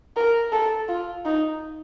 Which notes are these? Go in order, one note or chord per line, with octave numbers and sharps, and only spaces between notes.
A#4
A4
F4
D#4